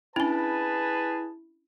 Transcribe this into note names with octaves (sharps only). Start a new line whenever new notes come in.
C#4 D4 E4 G#4 B4 A5